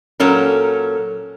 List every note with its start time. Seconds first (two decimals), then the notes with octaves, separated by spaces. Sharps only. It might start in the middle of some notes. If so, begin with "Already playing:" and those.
0.20 A#2 F#3 C#4 A4 A#4